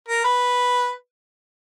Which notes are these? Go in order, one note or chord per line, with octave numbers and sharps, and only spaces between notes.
A#4
B4